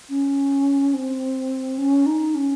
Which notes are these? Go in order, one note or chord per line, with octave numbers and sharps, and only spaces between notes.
C#4
C4
C#4
D#4
C#4